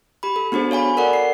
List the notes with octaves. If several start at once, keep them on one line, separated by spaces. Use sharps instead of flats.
G4 B5
A4
B3 D4 F#4 G#4 C5
C#5 F5 G#5 B5
A4 A#4 D5 F#5
C7